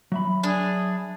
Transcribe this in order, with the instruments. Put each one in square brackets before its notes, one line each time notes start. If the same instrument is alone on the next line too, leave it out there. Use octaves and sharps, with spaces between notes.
[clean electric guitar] F#3 E5 B5
[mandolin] D4 [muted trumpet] G#4